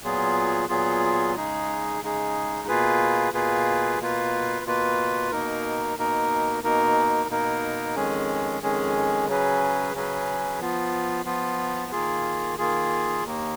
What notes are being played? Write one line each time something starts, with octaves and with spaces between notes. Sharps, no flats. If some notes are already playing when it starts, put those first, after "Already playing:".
A#2 F#3 B3 F4 G#4
A#2 F#3 B3 F4 G#4
C#3 G#3 D#4 G#4
C#3 G#3 D#4 G#4
B2 A#3 F4 G#4 B4
B2 A#3 F4 G#4 B4
B2 A#3 F4 B4
B2 A#3 F4 B4
B2 A#3 D#4 A#4
B2 A#3 D#4 A#4
B2 A#3 D#4 A#4
B2 A#3 D#4 A#4
F2 D#3 G#3 C#4 G#4
F2 D#3 G#3 C#4 G#4
C#3 F#3 C#4 G#4 B4
C#3 F#3 C#4 G#4 B4
F3 B3 F4
F3 B3 F4
D#3 A#3 F4 G#4
D#3 A#3 F4 G#4
D#2 D#3 A#3